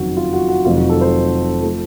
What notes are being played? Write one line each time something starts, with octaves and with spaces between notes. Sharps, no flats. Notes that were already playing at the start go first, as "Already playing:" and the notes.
Already playing: F#1 F2 D#3 F#3 F#4
F4
F#4
F#4
F1 F2 C3 D#3 F#3 F4
F#4
A4
C5
F3 A3